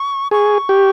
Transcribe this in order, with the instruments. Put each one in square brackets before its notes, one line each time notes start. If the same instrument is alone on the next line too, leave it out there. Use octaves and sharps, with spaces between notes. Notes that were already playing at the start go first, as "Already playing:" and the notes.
Already playing: [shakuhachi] C#6
[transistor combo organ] G#4 [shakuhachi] C#6
[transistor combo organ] G4